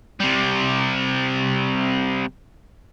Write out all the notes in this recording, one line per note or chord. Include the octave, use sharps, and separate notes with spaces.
C3 G3